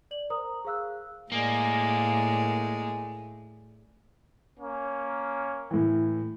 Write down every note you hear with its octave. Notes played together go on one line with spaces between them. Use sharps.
D5 F#7
A#4 C5 A#5 D#6
G#4 C5 F5 E6 F#6
A2 G#3 A#3 D5
A#3 C#4
A2 E3